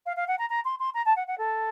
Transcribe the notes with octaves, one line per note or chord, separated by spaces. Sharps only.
F5
F5
F#5
A#5
A#5
C6
C6
A#5
A5
F#5
F#5
A4